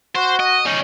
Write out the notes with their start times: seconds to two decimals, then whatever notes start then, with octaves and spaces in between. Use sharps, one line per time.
0.15 F#4 C5
0.40 D#5
0.66 C#4 D#4